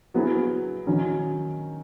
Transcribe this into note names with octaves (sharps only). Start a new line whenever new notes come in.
F#3 B3 E4 G#4
D#3 F#3 C#4